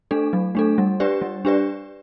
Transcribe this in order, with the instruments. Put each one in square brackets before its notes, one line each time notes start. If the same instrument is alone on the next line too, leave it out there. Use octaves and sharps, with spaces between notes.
[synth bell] A3 D4 A4
F#3
A3 D4 A4
G3
D4 G4 B4 D5
G3
D4 G4 B4 D5